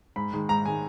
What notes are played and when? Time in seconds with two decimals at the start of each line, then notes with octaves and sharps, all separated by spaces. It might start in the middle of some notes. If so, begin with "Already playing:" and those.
0.16 G#2 B5
0.33 D#3 G#3
0.49 G#2 A#5
0.66 D#3 G#3 G#5